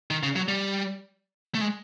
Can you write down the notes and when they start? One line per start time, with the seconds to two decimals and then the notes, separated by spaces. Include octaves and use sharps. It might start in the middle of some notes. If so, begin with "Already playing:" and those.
0.11 D#3
0.23 C#3
0.36 F#3
0.48 G3
1.55 A3
1.61 G#3